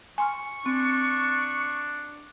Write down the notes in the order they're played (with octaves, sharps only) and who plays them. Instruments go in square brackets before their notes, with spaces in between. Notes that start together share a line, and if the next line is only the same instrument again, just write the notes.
[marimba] G#5 C6 F6 [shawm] C#6
[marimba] C4 [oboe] D4